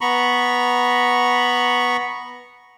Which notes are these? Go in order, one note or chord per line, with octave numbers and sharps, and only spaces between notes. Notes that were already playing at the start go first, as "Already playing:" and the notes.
B3 A#5 B5 C#6